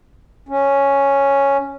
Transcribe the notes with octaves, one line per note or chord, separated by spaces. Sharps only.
C#4